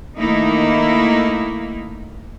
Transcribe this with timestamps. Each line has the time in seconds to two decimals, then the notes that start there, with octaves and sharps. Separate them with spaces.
0.17 D#3 A3 A#3 D#4 E4